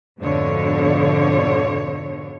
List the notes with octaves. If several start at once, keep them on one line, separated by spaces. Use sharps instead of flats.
F2 G#2 B2 D3 F3 C#5